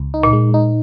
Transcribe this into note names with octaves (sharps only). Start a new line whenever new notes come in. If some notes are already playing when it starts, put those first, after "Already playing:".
Already playing: C#2
D#4
A#2
G#3
D#4